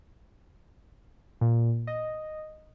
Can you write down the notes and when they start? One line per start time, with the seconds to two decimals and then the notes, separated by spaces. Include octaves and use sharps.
1.41 A#2
1.87 D#5